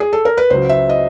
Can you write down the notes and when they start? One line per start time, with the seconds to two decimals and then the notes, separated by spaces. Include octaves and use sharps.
0.00 G#4
0.13 A4
0.25 A#4
0.37 B4
0.50 C#2 C#3 F#3 C5
0.69 E5
0.89 D#5